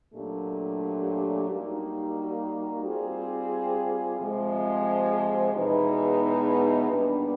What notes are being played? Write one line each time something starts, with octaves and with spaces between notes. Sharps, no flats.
A#2 F#3 A3 D4 G4
G3 A#3 D#4 F#4
G3 C4 F4 G#4
C3 F3 G#3
E2 B2 G#3 B3 D#4
A#2 G3 B3 D4